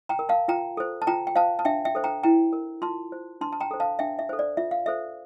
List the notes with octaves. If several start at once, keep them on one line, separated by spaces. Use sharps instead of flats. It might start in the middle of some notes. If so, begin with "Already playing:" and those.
G5 A#5
A#4
F5 A5
F4 G5 A#5
A4 C5
A5
F4 G5 A#5
G5
C5 F5 A5
A5
D4 E5 G5
E5 G5
A4 C5
G5 A#5
E4 G5 A#5
A#4
F4 A5 C6
C5
D4 A5 C6
A5
G5 A#5
A4 C5
F5 A5
D4 E5 G5
E5
A4 C5
D5
F4 E5
F5
A4 C5 E5